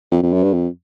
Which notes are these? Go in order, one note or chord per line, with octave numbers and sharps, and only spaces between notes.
F2
F2
F#2
G2
F2